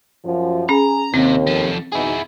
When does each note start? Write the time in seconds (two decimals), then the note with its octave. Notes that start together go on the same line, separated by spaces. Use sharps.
0.24 F#2 F3
0.69 C#4 G#4 A#5
1.14 D#2 C3 C4
1.47 F3 A3
1.92 B2 D#4 E4 G#4